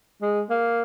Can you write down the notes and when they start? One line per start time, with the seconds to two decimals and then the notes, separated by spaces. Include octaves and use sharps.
0.22 G#3
0.50 A#3